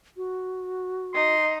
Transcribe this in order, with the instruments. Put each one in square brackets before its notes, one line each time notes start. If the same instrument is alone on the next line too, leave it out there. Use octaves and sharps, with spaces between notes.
[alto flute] F#4
[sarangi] D#4 [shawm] C6